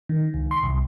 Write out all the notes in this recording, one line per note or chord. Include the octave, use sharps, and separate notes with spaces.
D#3
C#2
C6
C2